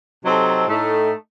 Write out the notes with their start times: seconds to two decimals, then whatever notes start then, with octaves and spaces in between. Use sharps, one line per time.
0.23 C3 F#3 C4 D#4 A4
0.67 A2 A3 D#4